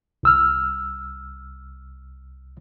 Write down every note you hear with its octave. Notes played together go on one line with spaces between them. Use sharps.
C2 E6 F6